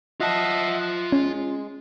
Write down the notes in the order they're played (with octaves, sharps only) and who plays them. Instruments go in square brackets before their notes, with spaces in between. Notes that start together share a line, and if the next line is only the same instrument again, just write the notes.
[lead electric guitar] F4 A5 [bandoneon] D#5 E5 F#5
[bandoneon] G#3 [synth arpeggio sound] C#4